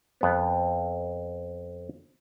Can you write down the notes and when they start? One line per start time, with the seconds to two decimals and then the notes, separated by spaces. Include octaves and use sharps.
0.21 F2 B3